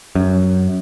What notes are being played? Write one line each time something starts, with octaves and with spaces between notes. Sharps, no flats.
F#2